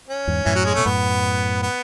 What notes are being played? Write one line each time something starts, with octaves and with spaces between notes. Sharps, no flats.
C#4
E2 G#2
F#2 A2 E3
F#3
G#3
B2 A3
F#2 A2 B3
B3